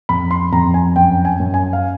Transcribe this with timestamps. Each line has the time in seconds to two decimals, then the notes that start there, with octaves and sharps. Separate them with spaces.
0.09 F2 B5
0.31 C6
0.52 F2 A#5
0.74 G#5
0.96 F#2 G5
1.25 G#5
1.40 F#2
1.54 G#5
1.73 F5